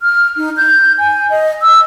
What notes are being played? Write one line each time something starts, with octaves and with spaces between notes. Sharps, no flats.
F6
D#4
G6
G#5
D#5
E6